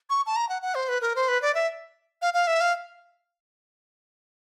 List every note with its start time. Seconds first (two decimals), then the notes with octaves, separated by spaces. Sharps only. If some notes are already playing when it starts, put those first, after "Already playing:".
0.10 C#6
0.26 A5
0.36 A#5
0.49 F#5
0.62 F#5
0.75 C5
0.89 B4
1.01 A#4
1.16 C5
1.28 B4
1.42 D5
1.55 E5
2.22 F5
2.34 F5
2.47 E5
2.61 F5